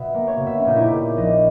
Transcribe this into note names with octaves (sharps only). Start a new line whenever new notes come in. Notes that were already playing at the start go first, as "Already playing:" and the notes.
Already playing: B2 E5
A#3
C#5
B2
E5
C#4
A#2 D#4
E4
G4
A#2 G#4
A#1 D#5